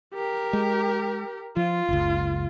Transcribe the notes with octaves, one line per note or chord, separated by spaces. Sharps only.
G4 A#4
G#3
F3 F4
F#1 C#2